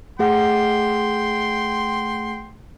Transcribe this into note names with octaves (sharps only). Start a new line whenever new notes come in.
A3 G#4 F#5 G5 C6